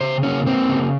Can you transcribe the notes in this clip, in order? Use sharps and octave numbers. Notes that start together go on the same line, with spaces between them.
C#3 C5
A#3 C#4
A#3 C4
C#3